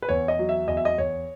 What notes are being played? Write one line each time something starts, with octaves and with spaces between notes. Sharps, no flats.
B4
E2 C#5
D#5
F#3
E5
E2 D#5
E5
D#5
E2 C#5